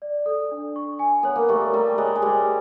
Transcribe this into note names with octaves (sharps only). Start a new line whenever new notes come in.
D5
A4
D4
C#6
G#5
B3 C#5
A#3
G3 A3 C#6
G3 A3 A#5
G#3 C#5
G#3
G3 C5